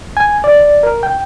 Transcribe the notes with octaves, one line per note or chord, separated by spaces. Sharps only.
G#5
D5
A#4
G5